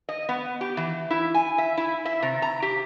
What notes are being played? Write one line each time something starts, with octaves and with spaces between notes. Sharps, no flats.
D#5
B3
G4
E3
E4
G#5
E5
E4
E5
C3
A#5
G4